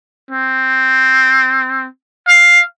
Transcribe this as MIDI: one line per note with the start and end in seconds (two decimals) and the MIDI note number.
0.31 1.86 60
2.28 2.62 77